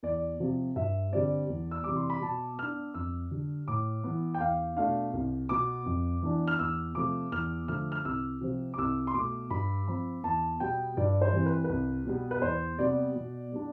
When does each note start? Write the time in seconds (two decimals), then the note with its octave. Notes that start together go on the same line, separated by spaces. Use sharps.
0.03 E2 D5
0.40 C3 F3
0.76 G2 E5
1.12 D3 G3 C4 D5
1.49 E2
1.71 E6
1.84 C3 E3 G3 D6
1.96 C6
2.10 B5
2.22 B2 A5
2.59 B3 D4 F6
2.94 F2 E6
3.31 D3 G3
3.68 A2 D6
4.04 E3 B3
4.34 G5
4.40 E2 F5
4.76 B2 A3 D4 F5
5.14 C2
5.49 B2 B3 D6
5.86 F2
6.22 E3 B3 D4
6.47 F6
6.59 E2 E6
6.95 C3 F3 A3 D6
7.32 E2 F6
7.68 D3 F3 A3 F6
7.92 F6
8.05 C2 E6
8.41 C3 F3 C4
8.74 D6
8.78 C2 E6
9.07 C6
9.14 B2 A3 D6
9.50 G2 B5
9.87 F3 C4 B5
10.23 E2 A5
10.60 B2 G3 B3 G5
10.97 G2 D5
11.21 C5
11.33 E3 G3 C4
11.46 B4
11.64 C2 B4
12.06 B2 G3 B3
12.31 B4
12.42 E2 C5
12.79 C3 G3 B3 D5
13.16 B2
13.52 G3 B3 D4